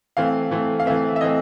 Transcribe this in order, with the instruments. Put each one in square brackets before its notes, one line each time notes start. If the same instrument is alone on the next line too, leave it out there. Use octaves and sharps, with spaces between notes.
[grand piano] E3 A3 C4 F5
E3 A3 C4
F5
E3 A3 C4 E5
E5
E3 A3 C4 D#5